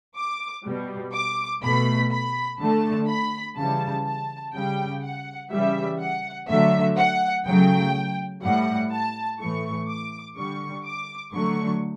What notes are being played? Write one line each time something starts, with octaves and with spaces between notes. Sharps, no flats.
D6
B2 G3
D6
B2 A3 B5
B5
D3 A3 A5
B5
C#3 E3 G3 A5
A5
C#3 G3 G5
F#5
C#3 E3 G3 E5
F#5
D3 F#3 A3 E5
F#5
C#3 F#3 A3 G5
A2 G3 F#5
A5
A2 E3 A3 C#6
D6
D3 G3 C#6
D6
D3 F#3 A3 C#6